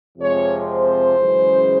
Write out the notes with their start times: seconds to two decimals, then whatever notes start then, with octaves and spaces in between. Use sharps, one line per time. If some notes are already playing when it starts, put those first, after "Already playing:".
0.17 F2 C3 F3 G#3 C#5
0.67 C5
1.17 F#2 C#3 E3 G#3